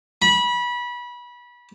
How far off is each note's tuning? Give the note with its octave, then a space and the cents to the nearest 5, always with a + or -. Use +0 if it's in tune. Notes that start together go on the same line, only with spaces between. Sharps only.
B5 -25